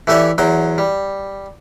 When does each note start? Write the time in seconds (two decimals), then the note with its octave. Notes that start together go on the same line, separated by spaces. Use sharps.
0.07 E3 A3 G4 C#5 D5
0.38 E2 F#3 G5
0.78 G3